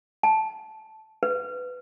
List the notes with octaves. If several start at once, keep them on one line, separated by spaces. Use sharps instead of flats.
A5
B4